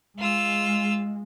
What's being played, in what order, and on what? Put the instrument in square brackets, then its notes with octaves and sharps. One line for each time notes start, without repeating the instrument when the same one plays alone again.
[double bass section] G#3 [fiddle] F4 E6